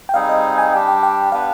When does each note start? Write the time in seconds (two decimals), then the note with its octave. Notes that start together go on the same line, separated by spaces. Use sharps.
0.09 G5
0.14 G3 C4 D#4 G#4 F5
0.29 D#5
0.58 G#5
0.73 G3 D4 G4 G5
0.88 G5
1.03 G5
1.32 B3 D4 G4 B4 F5